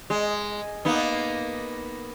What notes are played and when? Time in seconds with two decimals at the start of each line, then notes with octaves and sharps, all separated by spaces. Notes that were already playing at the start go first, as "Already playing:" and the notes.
0.10 G#3
0.85 A#3 B3 D#4